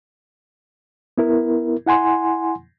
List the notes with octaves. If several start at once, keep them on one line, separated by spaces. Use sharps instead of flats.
B3 E4 A#4
E4 F#5 G#5 C6